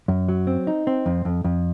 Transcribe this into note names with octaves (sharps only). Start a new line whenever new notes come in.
F#2
F#3
C4
D#4
C4
F2
F2
F2